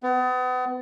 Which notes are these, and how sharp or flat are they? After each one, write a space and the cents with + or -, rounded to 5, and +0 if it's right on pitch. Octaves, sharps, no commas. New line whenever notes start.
B3 +35